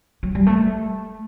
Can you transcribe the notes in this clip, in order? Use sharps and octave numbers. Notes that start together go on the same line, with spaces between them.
F#3
G3
A3